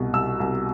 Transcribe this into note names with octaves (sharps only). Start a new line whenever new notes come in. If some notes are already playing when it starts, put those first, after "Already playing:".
Already playing: C2 B2
C2 E6
C2